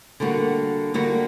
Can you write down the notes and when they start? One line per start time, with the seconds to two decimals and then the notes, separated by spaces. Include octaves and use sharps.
0.20 D3 G3 A#3 F#4
0.94 D3 G3 A#3 F#4